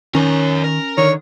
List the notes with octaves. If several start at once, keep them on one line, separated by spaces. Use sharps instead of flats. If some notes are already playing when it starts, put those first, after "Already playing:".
D#3 C#4 A#4 C#5
A#4
D3 D#3 C#5